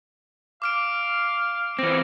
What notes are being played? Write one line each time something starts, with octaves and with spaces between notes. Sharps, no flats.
F5 D6 F6 D7
E3 C4 A#6